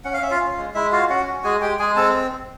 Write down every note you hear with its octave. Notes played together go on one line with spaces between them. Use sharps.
C#4 F#5
F5
C#4 E5
F4 F5
C#4
G#3
G#3 E4 E5
F4 F#4 F5
C#4 F#4 F#5
F#4
G#3 G#4 G#5
G#3 G4 G5
G#3 G#4 G#5
C4 A4 A5